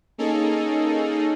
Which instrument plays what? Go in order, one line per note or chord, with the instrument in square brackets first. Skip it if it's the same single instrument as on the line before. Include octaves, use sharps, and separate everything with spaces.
[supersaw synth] A#3 C#4 D#4 G#4 A4